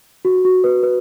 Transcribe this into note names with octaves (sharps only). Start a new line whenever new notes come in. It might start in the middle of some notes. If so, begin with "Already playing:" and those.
F#4
F#4
B4
B4